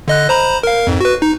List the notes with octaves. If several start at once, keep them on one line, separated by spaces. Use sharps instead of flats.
D3 D#5 F#6
C5 A#5 B5
A#4 F5
F2 G#2
F#4 B4
D#4